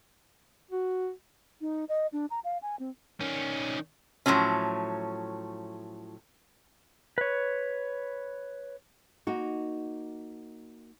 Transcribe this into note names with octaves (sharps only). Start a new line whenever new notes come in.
F#4
D#4
D#5
D4
A#5
F5
G#5
C4
D#3 C#4
A2 C3 F3 F#3 C#4
B4 C#5
A#3 D#4 F#4